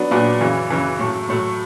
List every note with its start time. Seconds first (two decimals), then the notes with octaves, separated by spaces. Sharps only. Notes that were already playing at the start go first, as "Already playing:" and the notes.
Already playing: F#3 B3 D4
0.11 A#2 F#3 B3 D4
0.41 F#2 C#3 E3
0.70 F#2 C#3 E3
0.99 A2 F#3 A3
1.29 A2 F#3 A3